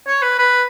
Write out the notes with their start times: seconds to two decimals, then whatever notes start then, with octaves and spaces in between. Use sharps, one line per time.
0.07 C#5
0.22 B4
0.39 B4